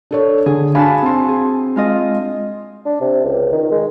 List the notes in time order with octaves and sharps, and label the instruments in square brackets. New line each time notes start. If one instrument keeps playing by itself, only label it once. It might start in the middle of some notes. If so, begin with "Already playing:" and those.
[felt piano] D4 A4 C#5
[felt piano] D3 [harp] G#4
[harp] D4 F#4 A5 [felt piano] F5 G#5 B5
[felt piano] C4 C6
[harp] G#4
G#3 F4 D#5
[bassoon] D4
C3
C#2
D#3
G#3